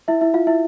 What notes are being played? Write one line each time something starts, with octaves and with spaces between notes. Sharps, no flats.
E4 E5
E4 E5
F4 F5
E4 E5